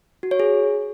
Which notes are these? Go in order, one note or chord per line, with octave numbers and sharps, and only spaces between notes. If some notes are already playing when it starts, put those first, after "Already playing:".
F#4
C#5
G#4